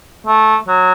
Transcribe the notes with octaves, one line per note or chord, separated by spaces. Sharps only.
A3
F#3